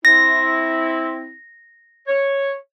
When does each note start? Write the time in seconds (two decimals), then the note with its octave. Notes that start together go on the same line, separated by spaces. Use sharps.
0.05 C4 E4 A#6
2.07 C#5